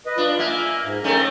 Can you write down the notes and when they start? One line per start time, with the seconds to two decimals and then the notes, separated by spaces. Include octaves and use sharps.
0.06 B4 D#5
0.18 D4 F4
0.39 A#3 E5 G#5
0.85 G#2
1.04 D#3 A3 C4 C#4 D#4